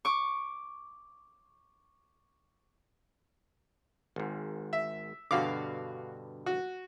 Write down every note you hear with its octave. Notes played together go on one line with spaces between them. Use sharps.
C#6 D6
G#1 G#2
E5
G2 B2 D3 F#4 F5 D6
F#4